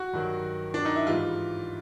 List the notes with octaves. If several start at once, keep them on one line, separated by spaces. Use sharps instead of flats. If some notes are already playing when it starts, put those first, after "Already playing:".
Already playing: F#4
G2 D#3 F#3
D4
D#4
E4
G#2 E3 G3 F4